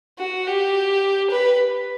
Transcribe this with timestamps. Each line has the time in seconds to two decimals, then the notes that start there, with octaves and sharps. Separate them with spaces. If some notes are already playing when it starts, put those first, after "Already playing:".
0.19 F#4
0.47 G4
1.31 B4